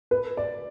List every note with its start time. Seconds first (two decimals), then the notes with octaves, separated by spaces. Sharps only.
0.11 B4
0.37 D5